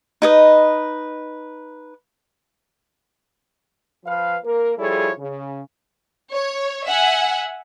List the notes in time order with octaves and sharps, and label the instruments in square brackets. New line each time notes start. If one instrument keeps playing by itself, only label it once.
[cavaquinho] D#4 B4 D#5
[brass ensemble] F3 B4 F5
A#3 A#4
F3 G3 E4 G#4 A4 C#5
C#3
[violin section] C#5
E5 F#5 G#5